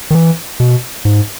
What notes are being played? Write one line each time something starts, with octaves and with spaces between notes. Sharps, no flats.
D#3
E3
B2
G#2